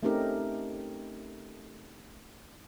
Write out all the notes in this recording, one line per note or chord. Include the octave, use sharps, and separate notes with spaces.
A3 C4 C#4 D#4 G4 A#4